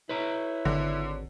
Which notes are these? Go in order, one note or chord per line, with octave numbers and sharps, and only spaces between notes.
E4 B4 C#5 A#5
G#1 D3